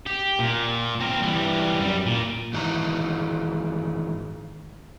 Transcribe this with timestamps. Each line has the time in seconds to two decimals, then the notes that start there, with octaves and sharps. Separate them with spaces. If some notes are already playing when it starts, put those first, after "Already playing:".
0.06 G4
0.39 A#2
1.00 C4 A#4
1.22 E3 G3
1.79 F#2 G3
2.06 A#2
2.53 G#2 D#3 E3 G#5 A#5